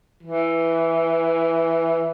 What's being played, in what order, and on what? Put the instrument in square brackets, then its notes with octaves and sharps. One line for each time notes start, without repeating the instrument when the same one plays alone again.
[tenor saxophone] E3